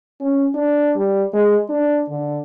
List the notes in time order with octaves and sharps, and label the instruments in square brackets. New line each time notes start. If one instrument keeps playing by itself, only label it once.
[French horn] C#4
D4
G3
G#3
D4
D3